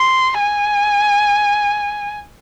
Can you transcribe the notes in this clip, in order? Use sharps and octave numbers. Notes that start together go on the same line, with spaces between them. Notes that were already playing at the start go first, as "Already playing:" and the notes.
Already playing: C6
G#5